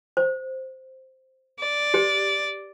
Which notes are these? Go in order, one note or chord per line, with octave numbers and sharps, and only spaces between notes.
C5
D5
G4 B4